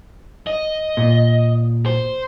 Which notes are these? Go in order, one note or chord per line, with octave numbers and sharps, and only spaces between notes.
D#5
A#2
C5